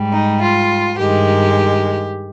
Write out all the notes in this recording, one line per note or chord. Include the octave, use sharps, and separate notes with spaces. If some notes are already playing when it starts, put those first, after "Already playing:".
Already playing: G#2 G3
D#4
F4
G2 D#3 G#3 G4